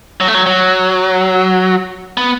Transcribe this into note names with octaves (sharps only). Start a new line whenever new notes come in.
F#3
A3
F#3
F#3
B3